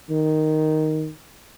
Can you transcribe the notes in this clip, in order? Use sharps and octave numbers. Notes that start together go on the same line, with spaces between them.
D#3